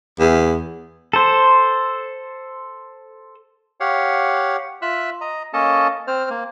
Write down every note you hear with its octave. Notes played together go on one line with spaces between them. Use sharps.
E2
A4 C5
G4 C#5 F5 F#5
F4 E5 E6 F#6
D#5 A#5
A#3 C#4 A4 D#5 A5
C4 C5 F6
A#3